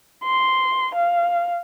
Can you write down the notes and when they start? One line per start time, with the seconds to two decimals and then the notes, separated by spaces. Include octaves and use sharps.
0.24 C6
0.94 F5